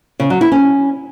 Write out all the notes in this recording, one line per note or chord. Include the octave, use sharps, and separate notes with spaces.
C#3
F#3
E4
C#4